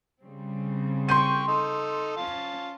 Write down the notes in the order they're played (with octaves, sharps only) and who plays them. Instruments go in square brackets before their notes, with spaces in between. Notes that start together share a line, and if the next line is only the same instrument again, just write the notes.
[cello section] C#3 G3 C4
[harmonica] G5 C#6 [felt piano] C6 G6 D#7
[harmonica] D#4 A4
[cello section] C#4 [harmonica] F4 A5